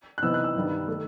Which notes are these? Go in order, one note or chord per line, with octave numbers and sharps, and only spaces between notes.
F#6
C3 E3 B3 D#4 E6
F#6
E6
G2 D#3 G3 B3
D#3 A3